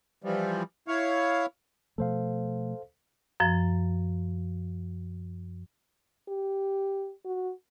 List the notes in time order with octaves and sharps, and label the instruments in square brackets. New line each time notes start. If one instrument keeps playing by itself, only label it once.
[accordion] E3 F3 G3
E4 C#5 F5
[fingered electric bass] B2 F3 A3 [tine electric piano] A4 C5 F5
[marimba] F#2 F3
[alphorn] G4
F#4